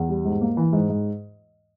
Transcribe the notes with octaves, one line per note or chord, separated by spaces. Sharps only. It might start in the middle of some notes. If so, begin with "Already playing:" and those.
Already playing: E2
G3
G#2
A#3
E3
G#2
G#2